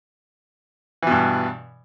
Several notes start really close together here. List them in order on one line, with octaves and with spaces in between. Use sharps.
E3 B2 G2